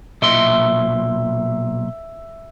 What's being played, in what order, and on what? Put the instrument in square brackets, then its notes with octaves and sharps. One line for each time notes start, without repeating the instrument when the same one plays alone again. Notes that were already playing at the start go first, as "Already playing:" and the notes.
[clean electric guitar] B1 A#2 C6 [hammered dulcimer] E5